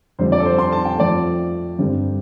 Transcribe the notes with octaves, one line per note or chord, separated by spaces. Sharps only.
F2 D3 G3 C5
D5
A4
C5
C6
A5
G5
F2 F3 A3 D5
G2 D3 G3 C4